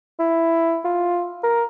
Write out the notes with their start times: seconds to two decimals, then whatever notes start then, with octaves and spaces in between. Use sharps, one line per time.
0.19 E4
0.85 F4
1.43 A#4